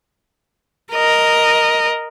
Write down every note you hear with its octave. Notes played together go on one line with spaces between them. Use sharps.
A#4 D#5